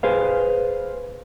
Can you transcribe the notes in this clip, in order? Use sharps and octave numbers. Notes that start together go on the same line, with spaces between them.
G#4 B4 C5 F5